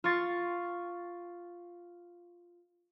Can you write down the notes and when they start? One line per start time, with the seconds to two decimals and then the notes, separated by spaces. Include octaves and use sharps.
0.04 F4 F5 C#6 A6